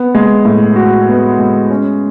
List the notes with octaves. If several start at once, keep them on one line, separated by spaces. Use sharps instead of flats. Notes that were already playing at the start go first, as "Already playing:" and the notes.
Already playing: B3
G#3
A2
F#4
B3
G#3
C#4